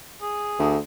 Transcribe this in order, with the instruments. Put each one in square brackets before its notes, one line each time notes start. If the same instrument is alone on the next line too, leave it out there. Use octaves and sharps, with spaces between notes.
[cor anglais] G#4
[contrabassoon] D2